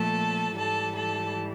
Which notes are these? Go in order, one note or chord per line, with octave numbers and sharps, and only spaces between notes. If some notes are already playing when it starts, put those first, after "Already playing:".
Already playing: A#2 F3 A3 A4 A5
G#2 E3 G3 A4 A5
A4 A5